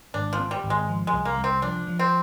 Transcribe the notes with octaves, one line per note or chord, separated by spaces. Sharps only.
G#1 D4
F3
C4
G3
G#1
G#3
F3
G#3
C2
A#3
C2
C4
F3 D4
F3
C4